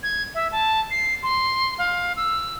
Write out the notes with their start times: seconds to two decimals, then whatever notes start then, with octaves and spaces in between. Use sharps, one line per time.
0.03 G#6
0.34 E5
0.52 A5
0.91 C7
1.23 C6
1.78 F5
2.16 E6